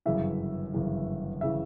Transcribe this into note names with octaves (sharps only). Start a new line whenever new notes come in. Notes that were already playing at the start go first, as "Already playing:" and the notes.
G1 F#2 C#3 E3 E5
G1 F#2 C#3 E3
C#3 E3 E5